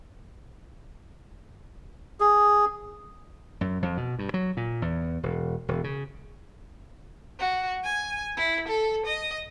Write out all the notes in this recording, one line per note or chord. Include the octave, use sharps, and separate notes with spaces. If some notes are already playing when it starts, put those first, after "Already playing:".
G#4
F#2
F2
B2
G2
F#3
A#2
E2
E1
E1
C#3
F#4
G#5
E4
A4
D#5